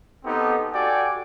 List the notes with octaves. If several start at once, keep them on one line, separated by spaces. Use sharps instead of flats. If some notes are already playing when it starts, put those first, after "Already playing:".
B3 C4 D#4 G4 A4
F#4 G4 A4 D5 G5 G#5